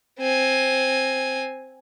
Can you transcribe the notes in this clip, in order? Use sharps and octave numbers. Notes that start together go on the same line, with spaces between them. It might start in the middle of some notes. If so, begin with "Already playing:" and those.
C4 G#5